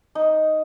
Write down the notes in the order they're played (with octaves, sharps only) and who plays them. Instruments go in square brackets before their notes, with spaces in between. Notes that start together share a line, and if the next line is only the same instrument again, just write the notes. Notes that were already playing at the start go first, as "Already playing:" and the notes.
[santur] D#4